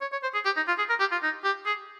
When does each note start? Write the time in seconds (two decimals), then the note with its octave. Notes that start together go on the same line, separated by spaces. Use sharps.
0.01 C#5
0.12 C#5
0.23 C5
0.34 G#4
0.45 G4
0.57 D#4
0.68 F4
0.78 G#4
0.90 A#4
1.00 G4
1.12 F4
1.23 D#4
1.44 G4
1.66 G#4